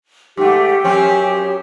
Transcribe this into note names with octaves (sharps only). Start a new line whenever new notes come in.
G#2 A3 G4
F#2 C4 C#4